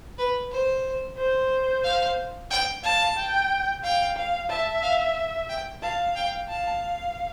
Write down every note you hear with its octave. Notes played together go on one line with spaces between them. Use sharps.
B4
C5
C5
F5
G5
F5 A5
G5
F5 G5
F5
E5 A5
F5
G5
F5 A5
G5
F5 A5